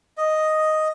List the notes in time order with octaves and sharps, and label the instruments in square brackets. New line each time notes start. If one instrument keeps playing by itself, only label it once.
[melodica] D#5